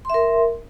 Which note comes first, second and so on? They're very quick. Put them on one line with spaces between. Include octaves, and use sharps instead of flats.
C6 E5 A#4